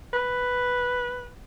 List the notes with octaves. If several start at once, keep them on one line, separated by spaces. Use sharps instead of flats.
B4